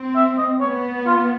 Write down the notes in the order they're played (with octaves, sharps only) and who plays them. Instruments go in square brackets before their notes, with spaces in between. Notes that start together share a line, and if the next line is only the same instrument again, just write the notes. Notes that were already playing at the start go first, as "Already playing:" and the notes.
Already playing: [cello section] C4
[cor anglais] E5
D#5
[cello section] B3 [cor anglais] C#5
[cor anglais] F4